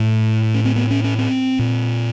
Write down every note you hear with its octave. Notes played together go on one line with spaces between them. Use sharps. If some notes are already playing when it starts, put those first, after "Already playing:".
Already playing: A2 A3
C#4
C4
B3
C#4
C#4
C4
A#2